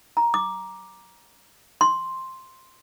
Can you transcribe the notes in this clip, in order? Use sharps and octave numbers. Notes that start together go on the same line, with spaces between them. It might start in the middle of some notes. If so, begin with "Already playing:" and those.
A#5
D6
C6